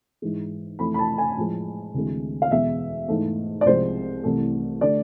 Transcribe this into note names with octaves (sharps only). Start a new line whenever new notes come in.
G#2 E3 G#3
F2 E3 A3 B5
B5
A5
G#5
A2 F3 G#3
D2 C3 E3 G#3
F5
E2 B2 G#3 E5
G#2 E3 A3
D5
C2 C3 F3 G#3 C5
C2 C3 E3 A3
D3 A3 D5